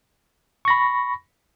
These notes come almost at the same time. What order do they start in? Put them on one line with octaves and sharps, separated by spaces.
C#6 A#6 B5